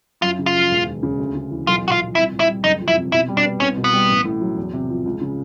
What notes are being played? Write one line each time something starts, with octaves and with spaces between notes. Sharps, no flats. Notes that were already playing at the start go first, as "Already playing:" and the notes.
F#2 F4
C#3
F4
F3
E1
D#2
C#3
D2
C#3
E3
B1 F4
A#2 F#4
F4
F3
C2 E4
A#2
E4
G3
F#1 D#4
F2
E4
C3
B2 E4
G3
D4
B3
C2 C#4
B2
B3
G3
A1
A2
F#3
E2
C3
F3
C#2
C#3